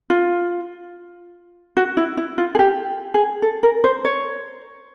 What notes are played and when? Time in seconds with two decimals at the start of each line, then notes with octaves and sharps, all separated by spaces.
0.10 F4
1.77 F#4
1.97 E4
2.17 E4
2.38 F4
2.55 G#4
2.59 G4
3.14 G#4
3.42 A4
3.63 A#4
3.84 C5
4.05 C#5